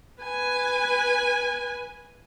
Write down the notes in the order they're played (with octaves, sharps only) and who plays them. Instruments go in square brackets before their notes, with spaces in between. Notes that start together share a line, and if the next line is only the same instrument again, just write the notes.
[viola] B4 G#5